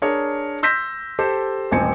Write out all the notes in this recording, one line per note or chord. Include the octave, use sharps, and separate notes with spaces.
D4 G#4 A#4 C#5
C6 E6 G6 A#6 B6
G4 A4 C5
D#1 A1 C4 G#5 C#7